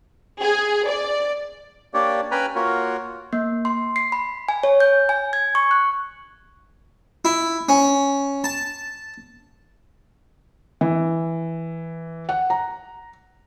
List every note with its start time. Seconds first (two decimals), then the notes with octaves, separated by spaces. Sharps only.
0.42 G#4
0.88 D5
1.94 A#3 D4 G4 C#5 D5
2.31 C#4 B4 G5 G#5 A#5 B5
2.55 A#3 F4 F#4 A#4 C#5
3.33 A#3
3.65 C6
3.96 C7
4.12 B5
4.48 G#5
4.63 C#5
4.80 G6
5.09 G#5
5.33 G#6
5.55 C#6
5.71 F#6
7.25 E4
7.69 C#4
8.44 A5
10.81 E3
12.29 F#5
12.50 A#5